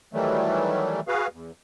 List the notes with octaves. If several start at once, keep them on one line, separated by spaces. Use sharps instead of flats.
D#3 E3 F#3 G3 A3
F#4 G#4 B4 F5
E2